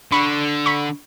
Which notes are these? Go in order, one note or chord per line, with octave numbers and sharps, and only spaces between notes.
D3 B5 C#6
B5 C#6